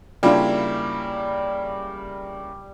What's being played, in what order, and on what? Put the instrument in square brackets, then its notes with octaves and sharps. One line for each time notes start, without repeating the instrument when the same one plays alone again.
[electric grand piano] C#3 A#3 E4 [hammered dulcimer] G3 [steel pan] D4 F4